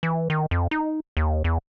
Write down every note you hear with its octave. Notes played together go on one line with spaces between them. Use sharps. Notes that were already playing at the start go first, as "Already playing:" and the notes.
E3
D#3
F2
D#4
D#2
E2